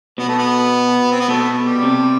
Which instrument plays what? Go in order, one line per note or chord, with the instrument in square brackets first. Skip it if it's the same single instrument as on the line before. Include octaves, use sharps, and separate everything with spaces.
[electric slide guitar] B2 [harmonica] B3
[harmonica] A3
B3
C4
B3
[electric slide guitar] B2 [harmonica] A3
[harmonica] G3
[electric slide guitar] C3